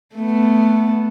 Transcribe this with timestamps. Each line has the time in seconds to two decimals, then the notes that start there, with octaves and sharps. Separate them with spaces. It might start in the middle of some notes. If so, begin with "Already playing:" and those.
0.15 A3 B3